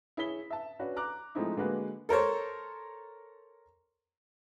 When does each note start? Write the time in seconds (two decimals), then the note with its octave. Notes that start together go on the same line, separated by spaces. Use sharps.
0.17 E4 G#4 C#5 B6 G7
0.50 E5 A5
0.79 C#4 D4 F#4 B4
0.96 A#5 D6 F#6
1.35 F3 G#3 A3 C4 D#4 E4
1.57 D3 G#3 A#3 F#4 B4
2.09 A4 A#4 C5 C#5